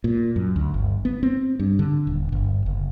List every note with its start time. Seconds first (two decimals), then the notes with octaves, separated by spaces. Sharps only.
0.04 A#2
0.36 F#2
0.56 D2
0.74 G1
1.05 B3
1.23 C4
1.59 G2
1.79 D3
2.07 D#1
2.32 G1
2.66 F#1